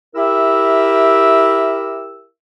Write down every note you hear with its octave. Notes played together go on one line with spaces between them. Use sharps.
E4 G4 A#4 E5 E6